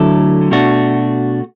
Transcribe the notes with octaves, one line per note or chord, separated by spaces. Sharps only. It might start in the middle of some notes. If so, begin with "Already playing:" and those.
Already playing: D3 F#3 A3 E4 A4
B2 A3 D4 F#4